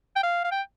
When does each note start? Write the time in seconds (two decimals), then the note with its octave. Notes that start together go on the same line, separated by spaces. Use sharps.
0.16 G5
0.23 F5
0.44 F5
0.52 G5